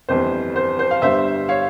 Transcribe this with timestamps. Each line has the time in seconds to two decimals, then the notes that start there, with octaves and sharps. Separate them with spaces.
0.09 G1 F2 E3 G3 C5
0.56 C5
0.79 C5
0.91 F5
1.02 G1 G2 G3 C5 E5
1.49 C#5 F5